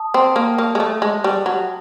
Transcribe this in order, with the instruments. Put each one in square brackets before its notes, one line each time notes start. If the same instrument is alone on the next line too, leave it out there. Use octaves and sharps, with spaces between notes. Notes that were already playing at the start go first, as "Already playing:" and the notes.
Already playing: [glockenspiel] A5 D#6
[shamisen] C4
A#3
A#3
G#3
A3
G#3
G3
F#3